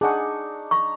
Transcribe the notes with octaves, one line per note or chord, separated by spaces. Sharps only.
D4 D#4 G#4 F#5 C#6
A#5 C#6